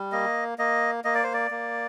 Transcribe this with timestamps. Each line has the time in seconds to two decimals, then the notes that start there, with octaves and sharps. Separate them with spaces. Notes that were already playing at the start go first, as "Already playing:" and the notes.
Already playing: G3
0.12 A#3 D#5
0.58 A#3 D#5
1.04 A#3 D#5
1.15 D5
1.23 C5
1.34 D5
1.51 A#3